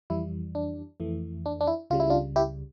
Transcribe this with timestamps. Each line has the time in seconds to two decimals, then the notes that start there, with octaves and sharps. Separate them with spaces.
0.10 F2 E3 G3 E4
0.55 D4
1.00 F2 E3 A3
1.46 D4
1.61 D4
1.67 E4
1.90 C#2 C#3 G3 F4
2.00 E4
2.10 D4 F4
2.36 E4 G4